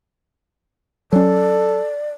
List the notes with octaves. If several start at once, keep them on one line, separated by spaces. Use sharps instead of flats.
F#3 C#4 A4 D5